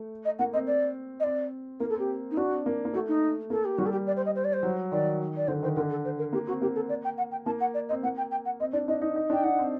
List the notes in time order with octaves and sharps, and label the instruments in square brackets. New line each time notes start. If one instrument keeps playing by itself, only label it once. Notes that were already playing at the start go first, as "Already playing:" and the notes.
Already playing: [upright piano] A3
[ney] D#5
[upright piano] A#3 [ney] F#5
[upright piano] C4 [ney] D#5
[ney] D5
D#5
[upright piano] C4 [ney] D5
[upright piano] A#3 [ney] A#4
[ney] A4
[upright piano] C4 [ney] G4
[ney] D#4
[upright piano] D4 [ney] F#4
[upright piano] C4
A#3
A#3
[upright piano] A3 [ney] F#4
[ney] D#4
[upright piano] A#3 [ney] A4
[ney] G4
[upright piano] G3 [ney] F#4
[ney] A4
G4
D5
C5
D#5
C5
D5
C5
[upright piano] F#3
[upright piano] D#3 [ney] D5
[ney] D5
[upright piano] D3 [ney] C5
[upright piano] D#3 [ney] C5
[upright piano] D3 [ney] A#4
[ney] A4
C5
A#4
[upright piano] A#3 [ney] G4
[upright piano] C4 [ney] F#4
[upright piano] A#3 [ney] G4
[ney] A4
D5
G5
F#5
G5
[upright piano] A#3 [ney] A5
[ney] F#5
D5
[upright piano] C4 [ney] D#5
[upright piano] A#3 [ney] F#5
[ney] G5
G5
F#5
[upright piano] C4 [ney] D#5
[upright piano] D4 [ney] D5
[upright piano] D4 [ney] D#5
[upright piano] D#4
D#4
[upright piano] D4 [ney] G5
[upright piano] D#4 [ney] F#5
[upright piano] C4